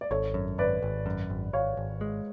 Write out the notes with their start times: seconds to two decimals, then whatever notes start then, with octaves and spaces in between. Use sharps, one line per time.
0.01 D5
0.11 G#1 A4 C#5
0.34 F#2
0.58 G#1 B4 D5
0.82 G#1
1.06 F#2
1.30 G#1
1.53 G#1 C#5 F5
1.77 G#1
2.01 G#3